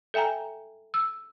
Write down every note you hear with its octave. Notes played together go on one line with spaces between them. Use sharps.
A4 E5 G5 G#5 A#5
E6